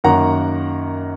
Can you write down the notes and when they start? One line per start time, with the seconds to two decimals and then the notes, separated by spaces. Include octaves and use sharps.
0.04 F#2 D#3 A#3 F#5 A#5